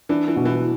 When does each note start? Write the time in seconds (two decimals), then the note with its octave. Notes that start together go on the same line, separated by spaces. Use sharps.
0.09 E3 D4
0.28 E3
0.36 B2
0.45 E3